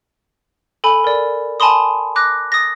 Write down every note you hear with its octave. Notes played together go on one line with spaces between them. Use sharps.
A4 G#5 B5
A#4 D5
G#5 A5 B5 C6 D#6
D6 F#6 A#6
D#6 A6 A#6